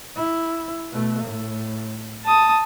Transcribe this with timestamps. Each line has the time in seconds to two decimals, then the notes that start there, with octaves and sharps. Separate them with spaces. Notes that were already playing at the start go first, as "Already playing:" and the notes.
0.16 E4
0.91 B2 A3
1.24 A2
2.25 A5 D#6